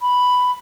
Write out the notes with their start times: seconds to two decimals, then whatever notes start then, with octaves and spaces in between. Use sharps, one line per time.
0.02 B5